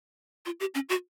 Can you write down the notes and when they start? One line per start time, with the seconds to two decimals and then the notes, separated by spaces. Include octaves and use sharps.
0.46 F4
0.60 G4
0.75 C#4
0.89 F#4